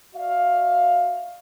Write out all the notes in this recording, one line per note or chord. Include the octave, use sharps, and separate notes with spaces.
F#4 D5 E5 F5